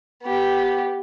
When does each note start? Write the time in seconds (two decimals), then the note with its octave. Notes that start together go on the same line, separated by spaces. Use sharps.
0.23 B3 G4